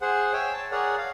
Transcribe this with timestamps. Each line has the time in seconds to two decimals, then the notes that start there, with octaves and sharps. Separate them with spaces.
0.01 G#4 C5 F#5
0.33 C#5 E5 G5 G#5
0.53 A5
0.72 G#4 A#4 C#5 D5 F#5
0.98 F5